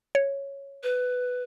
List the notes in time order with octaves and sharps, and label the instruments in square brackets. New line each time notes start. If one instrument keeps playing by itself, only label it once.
[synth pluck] C#5
[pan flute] B4